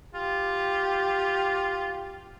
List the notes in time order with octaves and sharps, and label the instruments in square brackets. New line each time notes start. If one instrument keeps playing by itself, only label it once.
[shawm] F4 [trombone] G4